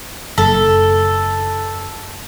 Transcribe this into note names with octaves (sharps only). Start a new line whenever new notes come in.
F#1 A4